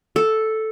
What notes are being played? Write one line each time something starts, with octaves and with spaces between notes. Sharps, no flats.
A4